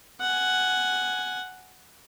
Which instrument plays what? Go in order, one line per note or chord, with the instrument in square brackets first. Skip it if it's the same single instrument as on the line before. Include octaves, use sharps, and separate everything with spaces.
[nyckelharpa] F#5 G#5